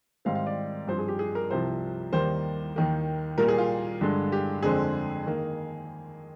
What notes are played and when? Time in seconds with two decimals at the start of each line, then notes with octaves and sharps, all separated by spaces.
0.25 G#2 D#3 G3 C4 F5
0.35 F5
0.47 D5
0.88 G2 F3 C4 C5
0.99 G#4
1.08 G4
1.19 G#4
1.35 A#4
1.50 C2 C3 F3 C5
2.12 D#2 D#3 G3 A#3 C5
2.76 D#2 D#3 A#3
3.38 A#2 G3 A#3 A#4
3.48 G#4
3.58 F4
4.01 G2 D3 G#3
4.32 G4
4.63 F2 D3 G#3 C4 G#4
5.26 D#3 A#3